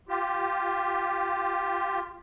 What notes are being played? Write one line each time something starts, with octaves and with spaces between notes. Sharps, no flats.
F4 G4